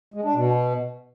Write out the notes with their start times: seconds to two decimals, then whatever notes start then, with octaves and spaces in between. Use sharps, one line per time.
0.14 G#3
0.24 D4
0.35 B2